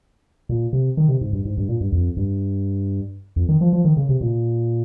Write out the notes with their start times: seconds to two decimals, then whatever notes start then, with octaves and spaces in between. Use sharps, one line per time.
0.49 A#2
0.73 C3
0.97 D#3
1.09 C3
1.21 G#2
1.33 G2
1.45 G#2
1.57 G2
1.69 A#2
1.80 G2
1.92 F2
2.17 G2
3.36 F2
3.49 D#3
3.61 F3
3.73 F3
3.85 D#3
3.97 C#3
4.09 C3
4.21 A#2